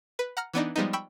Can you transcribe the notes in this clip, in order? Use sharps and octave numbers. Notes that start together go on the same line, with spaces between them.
B4
F#5 A#5 F6
E3 B3 D4 D#4
F3 G3 G#3 B3 D#4
G5 B5 C#6 E6